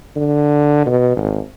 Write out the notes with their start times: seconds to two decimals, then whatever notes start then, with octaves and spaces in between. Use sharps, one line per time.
0.16 D3
0.86 B2
1.16 G#1